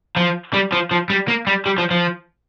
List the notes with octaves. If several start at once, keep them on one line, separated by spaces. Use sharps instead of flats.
F3
G3
F3
F3
G3
A#3
G3
G3
F3
F3